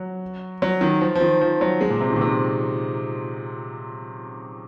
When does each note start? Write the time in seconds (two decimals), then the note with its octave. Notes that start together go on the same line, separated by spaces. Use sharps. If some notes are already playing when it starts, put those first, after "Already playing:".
Already playing: F#3
0.62 F#3
0.81 D#3
1.01 F3
1.15 F3
1.21 D#3
1.41 F3
1.61 F#3
1.81 G#3
1.90 A#2
2.01 C3
2.10 D#3
2.16 A#2
2.21 C3